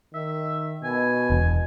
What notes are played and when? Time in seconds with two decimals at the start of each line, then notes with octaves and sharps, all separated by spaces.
0.14 D#3 E5
0.84 B2 G#5
1.30 E1